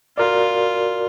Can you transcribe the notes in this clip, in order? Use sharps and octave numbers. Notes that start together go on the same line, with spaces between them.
F4 F#4 A#4 D5